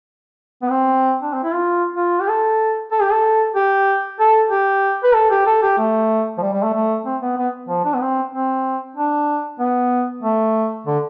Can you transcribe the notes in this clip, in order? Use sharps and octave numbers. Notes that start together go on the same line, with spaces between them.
B3
C4
D4
C4
E4
F4
F4
G4
A4
A4
G4
A4
G4
A4
G4
B4
A4
G4
A4
G4
A3
F3
G3
G3
A3
A3
C4
B3
B3
F3
D4
B3
C4
C4
D4
B3
A3
D3